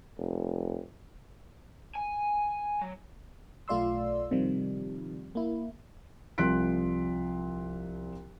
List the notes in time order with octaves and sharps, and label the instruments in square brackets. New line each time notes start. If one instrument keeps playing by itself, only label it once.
[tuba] F1
[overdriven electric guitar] G#5
F#3
[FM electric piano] B1 A3 F4 D5 C6 E6
C3 D#3 F3 G3
A#3 E4
[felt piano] C2 F3 C6 F#6 B6 D7